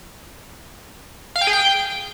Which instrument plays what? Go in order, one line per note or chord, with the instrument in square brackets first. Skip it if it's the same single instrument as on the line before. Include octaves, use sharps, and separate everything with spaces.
[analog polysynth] F5
G5
G#4
G5